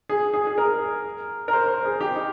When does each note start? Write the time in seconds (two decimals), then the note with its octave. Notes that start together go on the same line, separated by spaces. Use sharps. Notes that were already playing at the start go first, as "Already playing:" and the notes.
0.09 G#4
0.34 G#4
0.47 G#4
0.58 A#4
1.48 A#4
1.53 C5
1.68 C5
1.85 G#4
2.01 G4
2.15 D#4